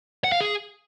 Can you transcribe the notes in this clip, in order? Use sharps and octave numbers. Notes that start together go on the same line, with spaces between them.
F#5
F5
G#4